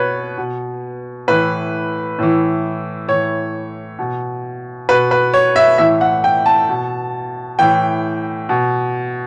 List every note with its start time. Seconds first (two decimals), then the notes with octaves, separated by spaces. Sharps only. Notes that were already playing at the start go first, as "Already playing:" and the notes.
Already playing: B2 B4 C#5
0.38 B2
1.28 A2 E3 B4
2.19 A2 E3
3.08 A2 E3 C#5
3.99 B2
4.89 B2 B4
5.11 B4
5.34 C#5
5.56 E5
5.78 A2 E3 E5
6.01 F#5
6.24 G5
6.46 A5
6.69 B2
7.59 A2 E3 G5
8.49 B2